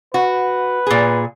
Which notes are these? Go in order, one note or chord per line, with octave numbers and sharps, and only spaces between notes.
F#4 B4
A#2 G#4